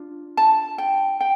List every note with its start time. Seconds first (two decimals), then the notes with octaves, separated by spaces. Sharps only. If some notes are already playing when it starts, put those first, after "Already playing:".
Already playing: D4 F4
0.37 A5
0.78 G5
1.21 G5